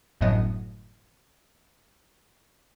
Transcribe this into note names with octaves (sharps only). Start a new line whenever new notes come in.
G1 F#2 A2 F#3 B3 D#5